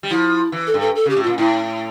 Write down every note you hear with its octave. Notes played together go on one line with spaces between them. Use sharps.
G3
F3 E4
E3
A4
G2
A4
A4
C#3
G4
A2
A#2 F4
A2 E4